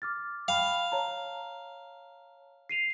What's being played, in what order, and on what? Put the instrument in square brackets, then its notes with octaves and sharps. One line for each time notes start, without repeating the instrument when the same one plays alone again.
[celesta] D6 F6 A6
[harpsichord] F5 [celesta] G5 B5
[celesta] C#5 A5 A#5
C7 D#7 F7